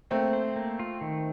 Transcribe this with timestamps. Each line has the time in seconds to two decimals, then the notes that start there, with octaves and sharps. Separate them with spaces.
0.11 A3 A#3 C4
0.33 C5
0.56 A#3
0.79 F4
1.01 D#3